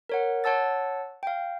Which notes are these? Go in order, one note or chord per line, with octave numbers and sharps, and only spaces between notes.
A#4 C#5 F#5
C#5 F#5 A5 E6 A6
F5 G5